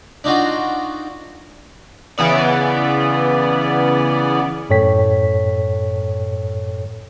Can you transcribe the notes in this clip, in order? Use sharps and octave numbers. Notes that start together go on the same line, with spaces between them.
D4 D#4 F4 F#4
C#3 E3 B3 D5
F#2 A2 A4 C#5 G5 B6